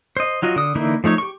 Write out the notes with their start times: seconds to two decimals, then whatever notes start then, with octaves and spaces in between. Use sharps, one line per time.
0.17 C5 D#5
0.42 F#3 F4 F#4 D#5
0.56 D3 D#6
0.75 D3 E3 A#3 D#4 E4
1.04 F3 A3 D#4 C#5
1.18 G4 C#6